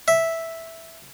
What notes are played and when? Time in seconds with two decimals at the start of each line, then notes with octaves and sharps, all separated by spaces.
0.08 E5